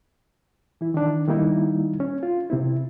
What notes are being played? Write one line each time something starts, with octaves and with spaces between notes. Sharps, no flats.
E3 E4
D#3 D4
D#3 G3 A#3 D#4 E4
C#4
F4
C3 C4 E4